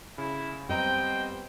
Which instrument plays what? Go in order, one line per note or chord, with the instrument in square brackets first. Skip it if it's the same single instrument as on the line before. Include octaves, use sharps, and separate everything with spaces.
[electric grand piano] C#3 [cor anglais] E4
[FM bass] F#2 [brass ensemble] G3 B3 C5 [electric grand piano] C4 D#5 A#5 [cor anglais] G5